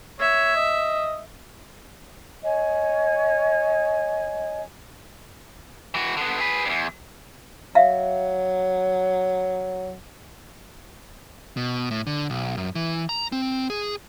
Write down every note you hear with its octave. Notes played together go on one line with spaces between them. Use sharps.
C#5 E5
D#5
C#5 D#5 G#5
E3 F#4
D3 B3
G#4 B4
E2 G2
F#3 E5 F5
B2
A2
D3
B1
F#2
E3
A#5
C4
G#4